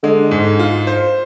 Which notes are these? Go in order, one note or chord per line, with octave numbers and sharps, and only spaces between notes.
D3 G#3
G#2
F4
C5